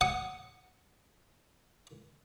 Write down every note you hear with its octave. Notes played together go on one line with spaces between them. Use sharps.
F#5 D#6